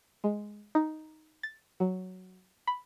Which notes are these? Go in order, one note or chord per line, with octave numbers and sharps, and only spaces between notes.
G#3
D#4
A6
F#3
B5